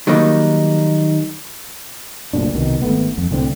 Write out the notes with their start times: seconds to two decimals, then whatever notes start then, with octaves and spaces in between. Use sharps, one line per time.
0.07 D#3 F#3 G3 A#3 D#4
2.33 F#1 D2 A#2 D4
2.53 C2 B2 D#3
2.82 G#1 A3 B3
3.18 F2
3.31 C2 A2 D3 C4